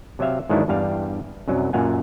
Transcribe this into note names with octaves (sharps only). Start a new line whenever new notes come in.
C3 F#3 C4 E5 F5
G#2 D#3 E3 F#3 D4 E4
E2 G2 G3 F5
C2 F#2 F#3
F#2 A#2 F5 F#5 G#5